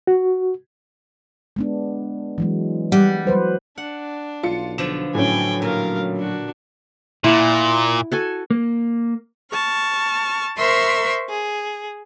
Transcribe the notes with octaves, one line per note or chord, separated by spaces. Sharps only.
F#4
G#3 B3 D4
E3 F#3 G#3
G3 F#5
F#3 B4 C5
D4 F#5
B1 F4 C#7
D3 F3 B3 E7
A2 F#3 C#4 G5 G#5
A#2 A#4 F5
D4 F#4
A#2 E4 F#5
F#4 A4 G#5
A#3
A5 C#6 F6
A#4 C5 E5 C6 C#6 E6
G#4